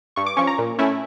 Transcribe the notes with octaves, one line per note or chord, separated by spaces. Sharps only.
G2 C#6
D6
F3 C#4 C#6
A#5
A#2
A3 C#4 E4